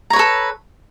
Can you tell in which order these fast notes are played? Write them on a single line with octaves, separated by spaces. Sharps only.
A#5 C#5 B4 A4